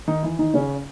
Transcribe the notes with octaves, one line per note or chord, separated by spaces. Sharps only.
D#3 D#4
E3 E4
D#3 D#4
C#3 C#4